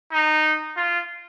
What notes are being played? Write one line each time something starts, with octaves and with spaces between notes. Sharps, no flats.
D#4
F4